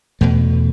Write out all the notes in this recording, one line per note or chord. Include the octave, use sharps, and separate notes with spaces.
E2 B2 A3